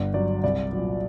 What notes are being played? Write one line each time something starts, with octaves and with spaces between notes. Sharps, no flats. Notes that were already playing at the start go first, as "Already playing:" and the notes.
Already playing: G1
G2 F#3 D5
C2 D5
A#2 F#3